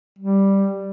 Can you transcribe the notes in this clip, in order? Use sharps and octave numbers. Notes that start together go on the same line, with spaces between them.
G3